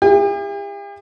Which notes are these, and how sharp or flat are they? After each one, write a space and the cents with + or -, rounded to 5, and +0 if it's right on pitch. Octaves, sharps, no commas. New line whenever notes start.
E4 +20 G4 +45